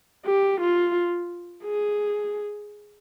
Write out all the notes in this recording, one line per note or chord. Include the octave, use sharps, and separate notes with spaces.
G4
F4
G#4